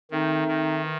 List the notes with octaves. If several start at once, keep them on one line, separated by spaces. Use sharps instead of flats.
D#3 A3 C4 D#4
D#3
E3